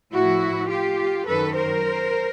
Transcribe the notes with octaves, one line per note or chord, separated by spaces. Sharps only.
A2 F3 E4 F#4
F4 G4
F#2 D#3 A4 B4
A#4 C5